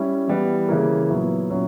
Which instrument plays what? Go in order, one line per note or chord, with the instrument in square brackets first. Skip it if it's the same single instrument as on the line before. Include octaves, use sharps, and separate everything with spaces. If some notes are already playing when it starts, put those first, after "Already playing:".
Already playing: [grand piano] G3 C#4 E4
E3 G3 B3
C#3 E3 A#3
A#2 F#3 B3 E4
A#2 F#3 C#4 E4